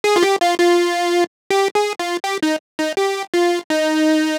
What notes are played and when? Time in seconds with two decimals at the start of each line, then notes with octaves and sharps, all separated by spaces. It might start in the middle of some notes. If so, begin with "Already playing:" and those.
0.04 G#4
0.16 F4
0.23 G4
0.41 F4
0.59 F4
1.50 G4
1.75 G#4
1.99 F4
2.24 G4
2.43 D#4
2.79 D#4
2.97 G4
3.34 F4
3.70 D#4